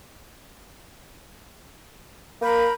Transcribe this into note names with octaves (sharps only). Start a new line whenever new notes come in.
A#3 A#4 B5 G6